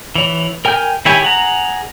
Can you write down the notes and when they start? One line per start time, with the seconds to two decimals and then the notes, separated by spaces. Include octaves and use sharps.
0.15 E3 C#5
0.65 A#4 G5 G#5 F6 G6
1.05 D#3 E4 G4 C#5 G#5
1.23 G#4 F#5 A#5